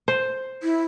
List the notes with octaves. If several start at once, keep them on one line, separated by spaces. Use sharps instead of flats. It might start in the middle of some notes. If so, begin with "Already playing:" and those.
C5
E4